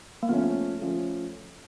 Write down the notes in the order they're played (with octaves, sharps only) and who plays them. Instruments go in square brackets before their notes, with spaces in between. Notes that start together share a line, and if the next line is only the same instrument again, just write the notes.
[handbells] A#3
[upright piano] F3 A3 C#4 [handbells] B3
[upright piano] F3 A3 C#4